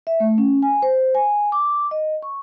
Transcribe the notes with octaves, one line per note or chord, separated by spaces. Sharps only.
E5
A3
C#4
G#5
C5
G#5
D6
D#5
C#6